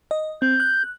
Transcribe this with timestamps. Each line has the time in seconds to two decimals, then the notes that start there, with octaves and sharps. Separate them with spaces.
0.11 D#5
0.42 C4 G6
0.60 F#6